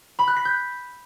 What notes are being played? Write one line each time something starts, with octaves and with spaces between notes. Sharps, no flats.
B5
F#6
B6
G6